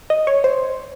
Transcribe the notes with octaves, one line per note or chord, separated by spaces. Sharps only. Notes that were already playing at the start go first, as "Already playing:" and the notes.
D#5
C#5
C5